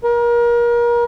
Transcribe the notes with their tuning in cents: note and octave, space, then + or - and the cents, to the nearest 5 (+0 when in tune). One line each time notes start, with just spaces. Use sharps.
A#4 +30